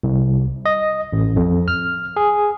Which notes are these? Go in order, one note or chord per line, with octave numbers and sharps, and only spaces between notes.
C2
D#5
A1
F2
F6
G#4